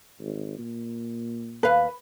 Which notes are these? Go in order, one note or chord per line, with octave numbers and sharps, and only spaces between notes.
G#1
A#2
D#2 B4 F5